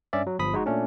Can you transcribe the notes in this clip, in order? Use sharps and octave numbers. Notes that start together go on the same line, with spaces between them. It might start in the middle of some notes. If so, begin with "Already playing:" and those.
G2 C#4 D5 E5
F#3
G1 F3 B5 D#6 B6
G#3 D#4 F#4
A#2 A3 C#4 D4